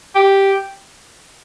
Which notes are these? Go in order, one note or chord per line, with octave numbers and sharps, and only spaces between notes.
G4